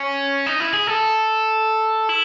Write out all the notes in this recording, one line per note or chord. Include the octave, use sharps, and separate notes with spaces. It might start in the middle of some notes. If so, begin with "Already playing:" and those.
Already playing: C#4
D#4
E4
G#4
A4
E4